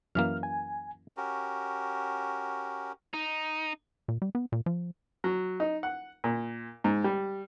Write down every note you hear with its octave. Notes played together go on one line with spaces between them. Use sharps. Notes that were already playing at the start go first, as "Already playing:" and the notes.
F#2 E3 A#3 F6
G#5
C#4 F#4 G4 A#4
D#4
A#2
G3
B3
A#2
F3
F#3
D#4
F#5
A#2
G#2
G3